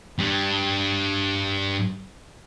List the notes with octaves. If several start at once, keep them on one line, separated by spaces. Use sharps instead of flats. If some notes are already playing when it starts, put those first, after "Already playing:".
G2 G3